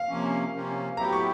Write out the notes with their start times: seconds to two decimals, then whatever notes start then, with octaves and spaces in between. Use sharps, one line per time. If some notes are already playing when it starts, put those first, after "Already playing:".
Already playing: F5
0.09 C3 F3 A#3 C#4
0.54 C3 F3 A#3 C#4
0.97 A2 F#3 B3 E4 G4 A#5
1.12 C#6